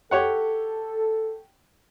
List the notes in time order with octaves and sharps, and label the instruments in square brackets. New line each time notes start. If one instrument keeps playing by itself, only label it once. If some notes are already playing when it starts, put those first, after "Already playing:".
[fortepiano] G4 C#5 F#5 [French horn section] A4